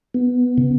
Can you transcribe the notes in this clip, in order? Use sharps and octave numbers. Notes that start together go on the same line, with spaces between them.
B3
C#3